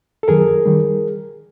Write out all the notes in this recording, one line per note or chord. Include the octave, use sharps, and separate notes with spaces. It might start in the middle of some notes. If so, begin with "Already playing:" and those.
A4
F#2 D#3 F#3 G#4 A#4
D#3 G3